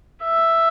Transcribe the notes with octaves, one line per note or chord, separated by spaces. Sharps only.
E5